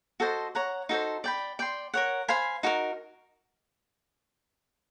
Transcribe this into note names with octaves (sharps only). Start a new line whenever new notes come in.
F#4 A4 C5 D#5
C#5 F#5 A#5
D#4 F#4 A4 C5
D5 G5 B5
D5 G5 C6
A#4 C#5 F#5
C5 F5 G#5 B5
D#4 F#4 A#4